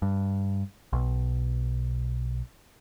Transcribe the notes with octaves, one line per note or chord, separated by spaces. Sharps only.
G2
B1